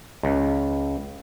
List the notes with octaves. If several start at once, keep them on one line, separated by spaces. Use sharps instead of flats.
C#2